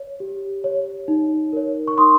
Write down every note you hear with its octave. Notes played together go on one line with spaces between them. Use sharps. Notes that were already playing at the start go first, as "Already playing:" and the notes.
Already playing: C#5
G4
C#5
D#4
A#4 C#5
C#6
D#4 C6 D#6